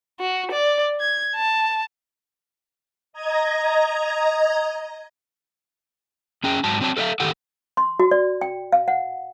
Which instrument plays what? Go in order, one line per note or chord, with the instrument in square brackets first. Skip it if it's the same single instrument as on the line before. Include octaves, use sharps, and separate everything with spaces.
[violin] F#4
D5
G#6
A5
[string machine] D#5 A#5 G#6
[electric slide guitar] F2 C#4 G#4 G5
G#2 F#3 A5
F#3 C4 C#5 A5
A4 B4 D5 E5 F5
A2 D#3 G4 A4 F#5
[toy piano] C6
F#4
D5
G5
F5
F#5